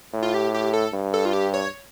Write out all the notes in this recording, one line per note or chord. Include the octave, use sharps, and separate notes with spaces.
A2
F4
G4
G4
A4
G2
A4
F4
G4
C#5